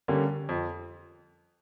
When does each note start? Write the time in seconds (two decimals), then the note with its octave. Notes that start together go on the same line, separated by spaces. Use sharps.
0.08 D3 G3 A#3 C#4
0.49 F2